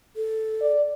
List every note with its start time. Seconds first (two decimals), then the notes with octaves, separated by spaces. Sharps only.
0.16 A4
0.61 D5